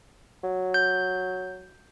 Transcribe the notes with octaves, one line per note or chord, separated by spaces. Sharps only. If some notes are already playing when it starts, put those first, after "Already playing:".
F#3
G6